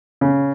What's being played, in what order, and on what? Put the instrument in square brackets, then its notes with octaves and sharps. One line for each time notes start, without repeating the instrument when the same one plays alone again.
[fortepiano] C#3